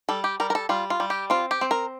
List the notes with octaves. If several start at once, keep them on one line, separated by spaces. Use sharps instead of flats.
G3 A4
G4
G3 A#4
A#4
A4
G3 F4
F4
G3
G4
C4 F4
G4
C4
A#4